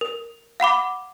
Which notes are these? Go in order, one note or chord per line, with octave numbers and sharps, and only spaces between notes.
A#4
F5 F#5 B5 D6